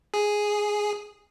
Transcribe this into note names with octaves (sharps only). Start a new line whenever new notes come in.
G#4